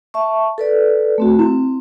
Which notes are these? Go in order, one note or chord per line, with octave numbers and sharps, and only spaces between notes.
E5 A5 C#6
A4 B4 D5
A3 C4 F#4
C4 E4